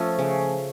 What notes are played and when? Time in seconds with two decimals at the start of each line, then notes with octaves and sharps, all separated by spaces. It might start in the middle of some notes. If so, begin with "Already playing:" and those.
Already playing: F3 A3 C#4
0.19 C#3